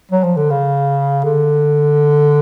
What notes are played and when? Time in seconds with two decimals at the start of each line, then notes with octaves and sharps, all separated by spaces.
0.11 F#3
0.23 F3
0.37 D3
0.50 C#3
1.24 D3